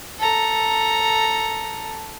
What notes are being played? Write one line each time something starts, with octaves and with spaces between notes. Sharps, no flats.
A4 A#5